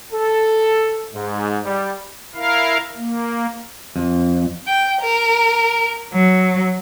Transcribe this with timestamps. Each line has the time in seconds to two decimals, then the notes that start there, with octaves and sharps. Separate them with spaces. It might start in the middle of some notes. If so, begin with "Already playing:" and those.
0.13 A4
1.13 G#2
1.65 G3
2.35 E4 A#4 F5
2.97 A#3
3.96 F2
4.66 G5
5.00 A#4
6.12 F#3